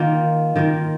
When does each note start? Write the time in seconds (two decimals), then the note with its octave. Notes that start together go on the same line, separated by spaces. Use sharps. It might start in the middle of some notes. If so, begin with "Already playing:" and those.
Already playing: D#3 A#3 F4
0.56 D#3 A#3 F4